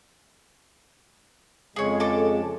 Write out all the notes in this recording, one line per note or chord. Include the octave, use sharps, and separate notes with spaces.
F2 C#3 G#3 G#4 C#5
A4 A5 D6